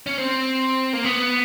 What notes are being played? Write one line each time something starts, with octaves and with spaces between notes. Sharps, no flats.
C#4
C4
A#3
B3